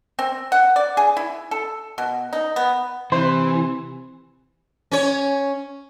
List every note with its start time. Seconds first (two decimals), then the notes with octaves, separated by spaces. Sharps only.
0.19 C4
0.52 F#5
0.76 D5
0.97 G#4
1.17 E4
1.51 A4
1.98 B2
2.33 D#4
2.56 B3
3.12 C3 E3 C5
4.92 C#4 C#5